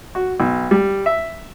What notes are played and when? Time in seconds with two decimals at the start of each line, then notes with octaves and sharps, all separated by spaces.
0.15 F#4
0.40 B1
0.71 G3
1.06 E5